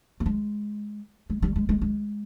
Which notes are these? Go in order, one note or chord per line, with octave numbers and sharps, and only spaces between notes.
A#3
G#3
G#3
G3
G#3
G#3
G#3